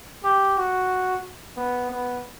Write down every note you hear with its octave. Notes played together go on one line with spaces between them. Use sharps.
G4
F#4
B3
B3